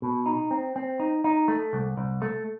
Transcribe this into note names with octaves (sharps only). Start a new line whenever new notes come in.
B2
D#4
C4
C4
D#4
D#4
A3
C2
C2
A3